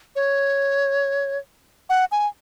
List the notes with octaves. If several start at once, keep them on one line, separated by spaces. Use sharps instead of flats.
C#5
F#5
G#5